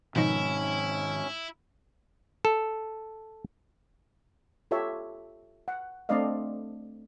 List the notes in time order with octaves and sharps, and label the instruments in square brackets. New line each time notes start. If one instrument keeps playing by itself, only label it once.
[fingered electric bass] G#2 D#3 [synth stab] B2 F3 D#4 [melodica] C#4 [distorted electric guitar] E4
[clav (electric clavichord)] A4
[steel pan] F4 G4 A4 C#5 E5
F#5
A3 C4 D4 D5 D#5 F5